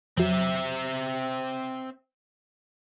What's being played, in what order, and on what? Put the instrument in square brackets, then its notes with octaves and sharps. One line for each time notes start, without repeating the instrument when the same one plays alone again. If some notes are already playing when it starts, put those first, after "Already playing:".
[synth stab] F2 F#3 [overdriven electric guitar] C4 E5